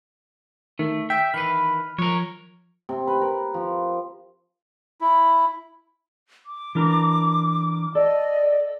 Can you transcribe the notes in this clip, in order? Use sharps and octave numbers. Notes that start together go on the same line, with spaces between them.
D#3 A3
E5 G5
D#3 E3 B4 B5 F6
F3 A#4 C#5
C3
B4
A#4
F3
E4
D6
E3 D4 A#4
A4 D5 D#5